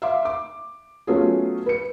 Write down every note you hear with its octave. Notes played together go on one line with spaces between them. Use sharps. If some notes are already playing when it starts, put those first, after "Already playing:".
E5 F5 C6 D6
D6
F#3 A3 B3 C#4 F4 G#4
B4 C#7